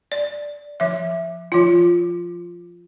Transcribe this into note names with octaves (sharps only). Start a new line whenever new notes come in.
D5
F3 E5
F3 F4